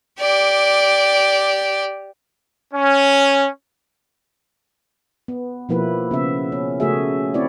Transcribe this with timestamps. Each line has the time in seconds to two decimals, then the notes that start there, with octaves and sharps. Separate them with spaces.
0.20 G4 D5
2.73 C#4
5.28 B3
5.69 B2 F3 A#3 E4 B4
6.11 C#3 B3 E5
6.52 C#4
6.80 C#3 A3 F#4 G#4 E5
7.34 C4 E4 C#5 D5